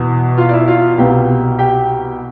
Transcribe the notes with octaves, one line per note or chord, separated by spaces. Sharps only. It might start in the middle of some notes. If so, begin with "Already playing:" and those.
Already playing: E2 B2 B3
F4 F5
D5
E4 E5
F4 F5
C2 B2 B3 G4 G5
G4 G5